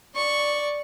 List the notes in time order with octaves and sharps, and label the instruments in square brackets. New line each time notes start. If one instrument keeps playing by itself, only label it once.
[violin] D5 C#6